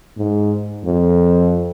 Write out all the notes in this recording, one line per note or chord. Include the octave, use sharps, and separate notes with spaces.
G#2
F2